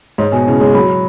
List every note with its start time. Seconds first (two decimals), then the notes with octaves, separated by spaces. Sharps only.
0.18 G#2 C#5
0.32 B2 G#5
0.47 C#3 E4
0.60 G#3 C#5
0.74 F#3 B5
0.89 F#4